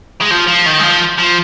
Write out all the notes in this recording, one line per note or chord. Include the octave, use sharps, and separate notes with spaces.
G#3
F3
F3
D#3
G#3
F3
F3